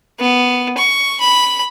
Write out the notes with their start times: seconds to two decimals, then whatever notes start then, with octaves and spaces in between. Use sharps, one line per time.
0.19 B3
0.77 C#6
1.21 B5